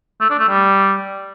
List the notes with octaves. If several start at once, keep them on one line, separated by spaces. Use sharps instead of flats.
A3
D4
A3
G3